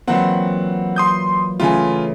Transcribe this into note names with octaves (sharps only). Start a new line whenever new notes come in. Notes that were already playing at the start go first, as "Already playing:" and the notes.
A#2 E3 F#3 C4 F#5
C6 D#6 G6
A2 C#3 E3 F4 G#5